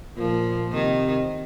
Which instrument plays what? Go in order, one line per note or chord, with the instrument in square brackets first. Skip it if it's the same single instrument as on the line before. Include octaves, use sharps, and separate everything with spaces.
[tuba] A#2 [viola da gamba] F3
[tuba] C3 [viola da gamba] D#3